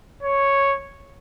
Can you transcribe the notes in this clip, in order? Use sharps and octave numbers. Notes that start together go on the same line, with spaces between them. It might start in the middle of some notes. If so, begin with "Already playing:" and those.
C#5